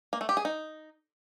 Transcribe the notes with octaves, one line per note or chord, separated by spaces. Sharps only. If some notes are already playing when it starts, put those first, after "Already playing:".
A#3
A3
G4
G#4
D#4